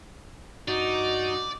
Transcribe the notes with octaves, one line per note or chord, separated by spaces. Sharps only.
G2 D#4 F#4 D5